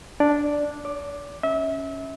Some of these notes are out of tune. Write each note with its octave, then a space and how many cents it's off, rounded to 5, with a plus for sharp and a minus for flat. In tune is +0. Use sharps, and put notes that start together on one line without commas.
D4 -5 D5 +0
D5 -45 D6 +10
C#4 +0 E5 -30